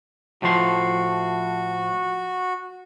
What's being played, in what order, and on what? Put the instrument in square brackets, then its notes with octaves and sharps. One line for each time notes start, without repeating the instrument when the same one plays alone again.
[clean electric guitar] A2 F3 C6 [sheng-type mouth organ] F#4